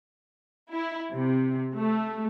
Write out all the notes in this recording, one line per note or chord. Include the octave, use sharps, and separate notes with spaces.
E4
C3
A3